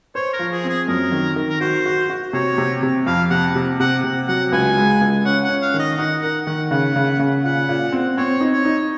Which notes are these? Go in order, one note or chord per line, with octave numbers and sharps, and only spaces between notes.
C5 C#5
A#4
F3
G#4
C4
G#4
F#2 A#4
D#3
D#3
A#4
F#4 C5
F#4
F#4
C3 C#5
C3
C3
F2 F5
C3 F#5
C3
C3 F#5
C3
F#3 F#5
C#2 G#5
G#3
C#2
C#4 F#5
F#5
C#4
F5
D#3
D#5
D#4 F#5
A#4 F#5
D#3 F#5
C#3 F#5
C#3
C#3
A#2 F#5
A#2
C4
C4 C#5
D#4
C#5
D#4